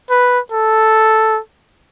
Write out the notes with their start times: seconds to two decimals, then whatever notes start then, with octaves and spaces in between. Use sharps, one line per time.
0.10 B4
0.52 A4